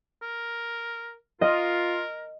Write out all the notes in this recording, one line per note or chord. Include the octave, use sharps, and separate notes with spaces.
A#4
F4 A#4 D#5